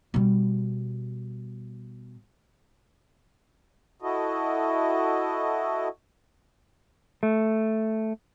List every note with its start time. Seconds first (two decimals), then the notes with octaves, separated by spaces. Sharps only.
0.14 B2 G3
4.02 E4 F#4 A4 D#5
7.23 A3